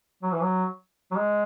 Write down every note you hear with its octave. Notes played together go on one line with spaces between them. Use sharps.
F#3
E3
F#3
F#3
G#3